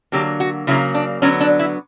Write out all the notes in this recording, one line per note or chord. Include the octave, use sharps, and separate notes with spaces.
D3 F#3 A#3 G4
F#4
C#3 F#3 A#3 E4
D4
D3 F#3 B3 C#4
D4
E4